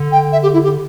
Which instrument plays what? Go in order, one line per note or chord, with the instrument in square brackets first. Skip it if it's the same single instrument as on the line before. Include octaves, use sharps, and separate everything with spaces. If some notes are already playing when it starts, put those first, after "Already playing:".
Already playing: [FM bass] D3
[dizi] G5
E5
G4
E4
G4